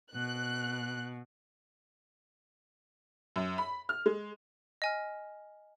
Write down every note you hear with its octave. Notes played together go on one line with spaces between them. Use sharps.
B2 F#6
F#2
B5
F6
G#3
D#5 G#5 F6